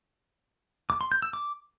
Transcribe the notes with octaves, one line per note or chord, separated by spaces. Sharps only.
D6
C6
G6
E6
D6